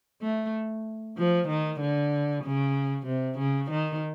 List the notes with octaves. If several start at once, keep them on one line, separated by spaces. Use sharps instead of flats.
A3
F3
D#3
D3
C#3
C3
C#3
D#3